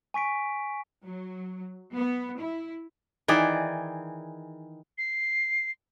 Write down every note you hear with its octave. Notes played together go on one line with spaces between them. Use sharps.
G#5 C#6 B6 D7
F#3
B3
E4
D#3 E3 G#4 D5
C7